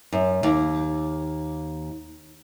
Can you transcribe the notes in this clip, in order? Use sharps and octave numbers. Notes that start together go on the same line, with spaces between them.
F#2
D#2